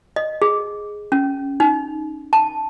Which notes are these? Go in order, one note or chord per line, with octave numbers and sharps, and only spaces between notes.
D#5
G#4
C#4
D#4
A5